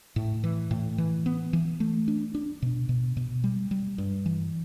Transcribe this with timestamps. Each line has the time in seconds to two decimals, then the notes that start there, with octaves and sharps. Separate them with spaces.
0.16 A2
0.44 E3
0.71 A2
0.98 E3
1.26 B3
1.53 E3
1.80 A3
2.08 D4
2.35 D4
2.62 B2
2.89 B2
3.17 B2
3.44 G3
3.71 G3
3.98 G2
4.26 E3